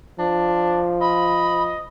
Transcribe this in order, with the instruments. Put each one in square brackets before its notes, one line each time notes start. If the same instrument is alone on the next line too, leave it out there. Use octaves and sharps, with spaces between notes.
[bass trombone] F3 [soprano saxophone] D4
[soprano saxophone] D#5 [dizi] B5